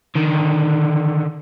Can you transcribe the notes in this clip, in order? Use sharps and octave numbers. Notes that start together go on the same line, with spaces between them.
D3 D#3